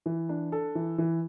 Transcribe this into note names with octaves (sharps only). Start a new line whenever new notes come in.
E3
D4
A4
E3
E3